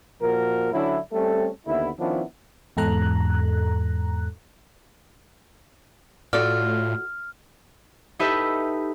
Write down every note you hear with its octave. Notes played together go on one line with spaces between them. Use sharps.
A#2 F3 F#4 A#4
D3 F#3 C#4 D4 E4
G3 A3 C4 C#4 A4
D#2 D3 B3 E4
D#3 F3 B3 C#4 D4 E4
E2 G#2 A4 A#5 F#6
A2 F4 F#4 A4 D5 F6
D#4 G4 A4 B4 D#5 E5